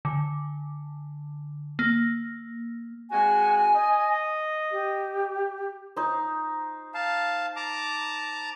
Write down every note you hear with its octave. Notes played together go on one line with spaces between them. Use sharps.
D3
A#3
G#3 C4 F#4 G#5
D#5
G4
D#4 C5
F5 A5
A5 A#5 D6